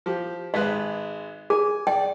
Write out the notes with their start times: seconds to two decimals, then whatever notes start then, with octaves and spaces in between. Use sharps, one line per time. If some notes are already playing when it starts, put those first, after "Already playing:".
0.06 F3 G4
0.54 G#1 G#3 B4 F5
1.50 G#4 G#5
1.87 D5 G5